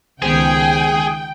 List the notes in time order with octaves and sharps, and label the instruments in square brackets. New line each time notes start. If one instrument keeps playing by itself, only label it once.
[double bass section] C#2 D#3 [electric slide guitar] B3 G4 C5 [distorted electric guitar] G#4 [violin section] G5